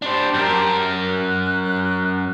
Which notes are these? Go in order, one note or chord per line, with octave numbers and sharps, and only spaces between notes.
D4 G4 C5 A5 C6
F#2 A#4
F#6